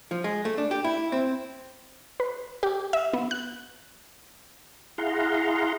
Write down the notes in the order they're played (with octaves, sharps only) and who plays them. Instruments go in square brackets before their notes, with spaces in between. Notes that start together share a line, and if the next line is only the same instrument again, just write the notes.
[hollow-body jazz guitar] F3
G#3
A3
D4
G4
E4
C4
[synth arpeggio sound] B4
G4
E5
B3
F#6
[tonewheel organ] E4 G#4 F5 F#5 A#5 C6